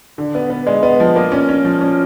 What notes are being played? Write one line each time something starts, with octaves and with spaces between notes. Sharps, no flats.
D3
B3
B3
G#3
B3
F3
A#3
C#4
C#4
F3
C#4